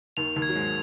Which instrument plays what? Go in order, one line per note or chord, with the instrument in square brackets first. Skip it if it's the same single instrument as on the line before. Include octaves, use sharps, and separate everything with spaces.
[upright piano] D#2 D#3 [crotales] F7
[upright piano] D#2 D#3
[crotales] G#6
[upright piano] F#3
G#2 G#3